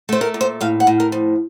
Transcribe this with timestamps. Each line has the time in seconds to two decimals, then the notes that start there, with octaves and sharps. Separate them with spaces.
0.09 A3 C5
0.21 A#4
0.34 A#2
0.41 C5
0.61 A2 F5
0.80 F#5
0.87 A2
1.00 A#4
1.12 F3